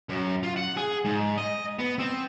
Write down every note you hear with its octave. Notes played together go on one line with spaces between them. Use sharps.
F#2
F4
F#5
G#4
G#2
D#5
B3
C4